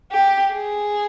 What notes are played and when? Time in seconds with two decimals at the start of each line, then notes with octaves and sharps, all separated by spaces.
0.12 G4
0.54 G#4